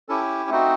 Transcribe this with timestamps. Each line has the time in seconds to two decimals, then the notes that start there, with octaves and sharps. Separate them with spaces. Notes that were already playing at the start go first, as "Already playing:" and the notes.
0.09 C#4 E4 G4 A4
0.50 A3 C4 D#4 F#4